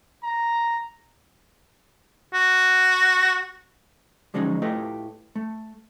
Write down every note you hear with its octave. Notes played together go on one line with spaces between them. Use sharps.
A#5
F#4
D3 F3 F#3 G#3 C#4 D#4
A2 A3 F4 G4 B4 D#5
A3